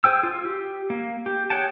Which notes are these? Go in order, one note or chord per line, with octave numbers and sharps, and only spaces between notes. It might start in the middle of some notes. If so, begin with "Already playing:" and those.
G#4 C5 G5 E6
F4
G4
A#3
G4
G#4 C#5 F#5 G5 A5